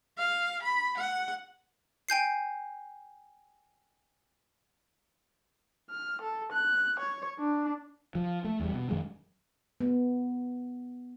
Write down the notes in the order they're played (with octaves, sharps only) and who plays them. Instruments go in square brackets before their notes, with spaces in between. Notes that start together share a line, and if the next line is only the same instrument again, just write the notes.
[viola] F5
B5
F#5
[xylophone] G5 G#5 G6 C7
[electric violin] F6
A4
F#6
C#5
D4
[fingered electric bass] F3
A3
E2 G3
B2
F#2 D#3 F#3 G#3
[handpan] B3